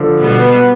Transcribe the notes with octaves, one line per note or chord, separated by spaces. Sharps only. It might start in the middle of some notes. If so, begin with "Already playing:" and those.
Already playing: D3 F3
B2 G3 B3